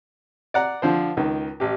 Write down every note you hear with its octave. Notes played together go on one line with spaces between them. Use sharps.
D5 F#5 A#5
D3 F3 C5
C#2 D#3
A1 G4